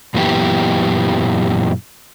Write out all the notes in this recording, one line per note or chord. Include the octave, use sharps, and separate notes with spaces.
F#2 A#2 E3 B3 G4